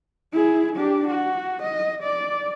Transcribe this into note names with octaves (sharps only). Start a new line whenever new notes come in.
E4 G#4
D4 G4
F#4
D#5
D5